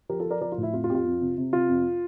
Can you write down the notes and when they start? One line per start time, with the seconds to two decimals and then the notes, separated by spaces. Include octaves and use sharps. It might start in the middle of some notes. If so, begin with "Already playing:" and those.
0.09 F3 G4 A#4
0.20 F4 A4
0.26 F3
0.31 A#4 D5
0.41 F3 A#4 D5
0.52 F4
0.58 A2
0.63 E4
0.73 F2 F4
0.84 F4
0.89 F2 G4
0.95 F4
1.05 F2
1.21 C3
1.38 C3
1.53 C3 F4
1.69 F2